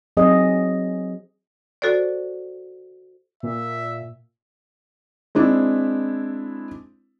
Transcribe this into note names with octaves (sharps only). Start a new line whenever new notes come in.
F#3 C4 G#4 D#5
F#4 A4 C5 D5
A#2 E5
G#3 C4 D4 E4